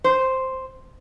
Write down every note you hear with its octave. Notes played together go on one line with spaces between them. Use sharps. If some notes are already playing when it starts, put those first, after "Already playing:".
C5